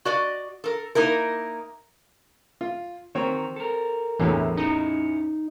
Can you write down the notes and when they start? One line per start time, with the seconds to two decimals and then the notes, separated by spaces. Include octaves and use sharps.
0.05 F#4 D5 D#5
0.64 A4 A#4
0.95 A#3 D#4 E4 A#4
2.61 F4
3.15 D#3 C4 F#4 A#4 C#5
3.56 A4 A#4
4.20 E2 A2 D3 E3
4.57 C#4 D#4 E4